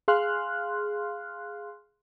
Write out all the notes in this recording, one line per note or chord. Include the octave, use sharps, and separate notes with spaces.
G#4 F5 C6 F6 F#6